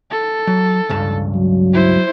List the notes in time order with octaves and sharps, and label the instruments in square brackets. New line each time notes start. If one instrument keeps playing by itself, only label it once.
[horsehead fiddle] A4
[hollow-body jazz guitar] F#3
C#2 G2 A5
[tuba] F#3
[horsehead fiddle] E4 C5